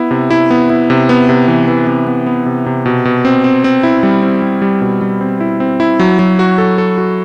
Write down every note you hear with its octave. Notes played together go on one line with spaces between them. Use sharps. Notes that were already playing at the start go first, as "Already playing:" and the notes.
Already playing: B3 E4
C3
E4
B3
E4
C3
B3
C3
E3
E3
C3
B3
B3
C3
C3
B2
B2
C4
C4
C4
E4
G3
C4
G3
G3
B2
G3
C4
E4
C4
E4
F#3
F#3
F#4
A4
A4
F#4